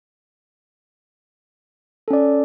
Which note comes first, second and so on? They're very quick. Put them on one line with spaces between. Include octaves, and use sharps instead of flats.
A4 C#4 D5